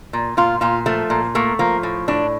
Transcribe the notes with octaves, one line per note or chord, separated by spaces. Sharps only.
A#2
A#2 F4
A#2 F4
F3 A3
A#2
A3 A#3
F3 A#3
A2
A2 D4